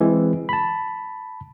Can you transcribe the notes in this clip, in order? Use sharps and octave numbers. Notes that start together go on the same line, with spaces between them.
E3 G#3 C4
A5 B5